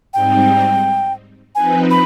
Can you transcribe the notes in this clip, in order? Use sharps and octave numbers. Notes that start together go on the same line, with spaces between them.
G#2 G3 C4 D#4 G5
F3 C4 D#4 B4 G#5
B5